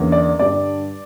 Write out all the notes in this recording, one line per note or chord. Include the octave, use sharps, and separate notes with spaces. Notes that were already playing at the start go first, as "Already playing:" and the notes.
Already playing: E2 D3 A#3 C#4
D5
G2 D3 G3 D5